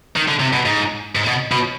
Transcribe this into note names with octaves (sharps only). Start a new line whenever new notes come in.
D#3
D3
C3
B2
G#2
G#2
B2
B2